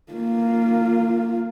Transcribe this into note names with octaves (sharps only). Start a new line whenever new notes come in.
A#3 F4